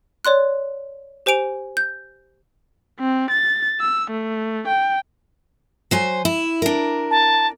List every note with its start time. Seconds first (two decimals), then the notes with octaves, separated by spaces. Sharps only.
0.25 C#5 D5 C6 F#6
1.26 G4 C5 G#5 D7 F7
1.77 G6
3.00 C4
3.30 A6
3.80 E6
4.11 A3
4.68 G5
5.91 F#3 C5 G#5
6.25 E4
6.62 D4 A#4
7.11 A5